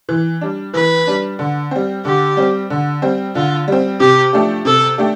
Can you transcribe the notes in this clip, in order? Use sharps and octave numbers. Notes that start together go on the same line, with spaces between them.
E3
G3 D4
E3 B4
G3 D4
D3
G3 C4
D3 G4
G3 C4
D3
G3 C4
D3 F4
G3 C4
C3 G4
F3 A3 D4 G4
C3 A4
A3 D4 G4